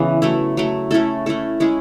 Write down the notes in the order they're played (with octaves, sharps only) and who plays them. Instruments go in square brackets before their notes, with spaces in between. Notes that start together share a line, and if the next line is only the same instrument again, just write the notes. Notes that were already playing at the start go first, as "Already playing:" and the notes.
Already playing: [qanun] C#3 E3 B3
F#3 A3 E4
F#3 A3 E4
A3 C#4 E4 A4
A3 C#4 E4 A4
G#3 C#4 E4 G#4